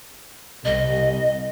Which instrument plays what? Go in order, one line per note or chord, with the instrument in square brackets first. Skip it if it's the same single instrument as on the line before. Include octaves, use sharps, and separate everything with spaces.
[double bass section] C2 [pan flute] D#5